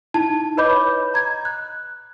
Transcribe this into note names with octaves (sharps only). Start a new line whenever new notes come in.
D#4 E4 A5
B4 C#5 D#5 B5 D6 G6
A#5 G#6
F#6